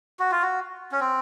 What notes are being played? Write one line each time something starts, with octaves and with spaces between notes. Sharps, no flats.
F#4
F4
F#4
C#4
C4